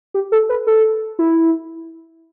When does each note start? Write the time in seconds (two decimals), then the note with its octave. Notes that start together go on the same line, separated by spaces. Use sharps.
0.14 G4
0.32 A4
0.49 B4
0.67 A4
1.19 E4